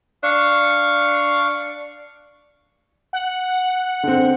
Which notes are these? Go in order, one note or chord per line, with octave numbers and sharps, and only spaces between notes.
D4 F5 C#6
F#5
D3 C4